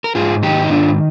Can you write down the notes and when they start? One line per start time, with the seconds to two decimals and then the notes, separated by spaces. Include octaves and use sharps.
0.04 A#4
0.15 G#2 F4 G#4
0.42 D#3 D#4 G4
0.63 D#4
0.70 G#2 D4 F4